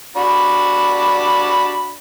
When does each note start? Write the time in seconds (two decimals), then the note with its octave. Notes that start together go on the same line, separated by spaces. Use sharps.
0.16 D4 F#4 B5